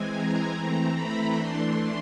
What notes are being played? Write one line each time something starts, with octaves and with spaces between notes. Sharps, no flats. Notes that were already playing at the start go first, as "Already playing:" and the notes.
Already playing: E3 G#3 C4 G#5
A#5
E3 A3 C4
B5
E3 A3 D4 C6